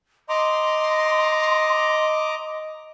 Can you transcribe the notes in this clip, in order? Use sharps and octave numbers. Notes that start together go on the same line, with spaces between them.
D#5 A#5 C6 D6